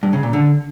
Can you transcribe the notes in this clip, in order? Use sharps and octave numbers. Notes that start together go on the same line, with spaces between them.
G2
C#3
A#2
D3